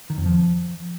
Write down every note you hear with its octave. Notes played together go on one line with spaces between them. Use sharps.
D#3
F2
F3